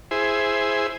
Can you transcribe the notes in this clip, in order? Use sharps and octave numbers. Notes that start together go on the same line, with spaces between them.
E4 G#4 C5